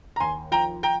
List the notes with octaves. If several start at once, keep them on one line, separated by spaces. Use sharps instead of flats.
A#5
D#2 G#5 C6
F3 G5 A#5
G5 A#5